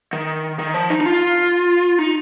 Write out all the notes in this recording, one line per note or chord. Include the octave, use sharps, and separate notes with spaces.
D#3
D#3
F3
D#4
D#4
F4
D#4